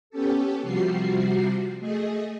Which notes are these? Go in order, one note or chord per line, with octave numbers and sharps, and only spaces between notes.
B3 C#4 G4 A4
C3 F3 G3 F#4 C7
A3 G#4 D#5